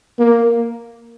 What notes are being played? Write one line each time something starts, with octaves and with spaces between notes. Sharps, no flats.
A#3